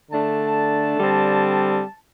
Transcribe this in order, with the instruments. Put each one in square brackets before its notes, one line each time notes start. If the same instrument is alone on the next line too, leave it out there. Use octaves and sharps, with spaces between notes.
[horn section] D3 A3 D4 A5
D3 G3 C4